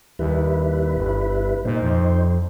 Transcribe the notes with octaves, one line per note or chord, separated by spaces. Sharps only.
D#2 G3 E4 B4
G1
A#2 D#4 C5
F2